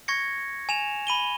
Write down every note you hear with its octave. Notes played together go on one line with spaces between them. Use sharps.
C#6 G#6 A#6 C#7
G#5 E7 F7
B5 D#7 G7